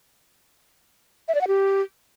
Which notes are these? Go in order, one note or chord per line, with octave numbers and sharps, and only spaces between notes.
E5
D5
F#5
G4